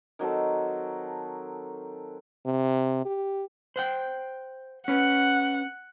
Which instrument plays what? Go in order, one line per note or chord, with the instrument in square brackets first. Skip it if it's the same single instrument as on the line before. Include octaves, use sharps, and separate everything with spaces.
[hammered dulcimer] D#3 F#3 C4 A4
[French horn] C3
G4
[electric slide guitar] C5 F#5 G5
[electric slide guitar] C#4 B4 [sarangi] F#5